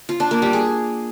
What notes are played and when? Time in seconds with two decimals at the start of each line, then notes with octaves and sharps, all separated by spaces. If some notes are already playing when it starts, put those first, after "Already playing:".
0.09 F4
0.20 D4
0.31 A#3
0.42 G3
0.53 G#4